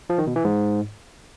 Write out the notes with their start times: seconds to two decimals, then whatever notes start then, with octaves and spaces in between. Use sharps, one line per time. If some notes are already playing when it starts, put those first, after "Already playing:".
0.10 F3
0.18 D#3
0.27 B2
0.36 E3
0.44 G#2